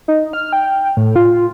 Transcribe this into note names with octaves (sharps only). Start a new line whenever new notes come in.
D#4
F6
G5
A2
F4